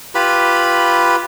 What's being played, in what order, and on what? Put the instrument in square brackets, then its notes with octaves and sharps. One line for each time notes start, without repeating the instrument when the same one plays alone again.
[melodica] F4 G4 B4 B5